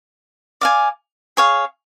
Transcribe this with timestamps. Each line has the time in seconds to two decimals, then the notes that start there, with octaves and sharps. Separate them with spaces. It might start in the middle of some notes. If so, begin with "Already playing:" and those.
0.61 D5 F5 G#5
1.37 G#4 C#5 F5